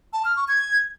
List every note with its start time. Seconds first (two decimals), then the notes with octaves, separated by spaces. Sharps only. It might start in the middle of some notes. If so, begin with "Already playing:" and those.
0.13 A5
0.25 F6
0.37 C#6
0.48 G#6